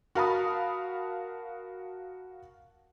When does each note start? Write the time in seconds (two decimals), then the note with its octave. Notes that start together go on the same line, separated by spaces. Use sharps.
0.15 F#4 A#4 F5 A5 B5 D#6